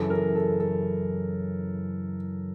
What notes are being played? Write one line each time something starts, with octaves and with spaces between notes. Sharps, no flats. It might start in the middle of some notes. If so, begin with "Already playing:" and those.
Already playing: F#2 C#3 E3 A4
A#4
A4
A4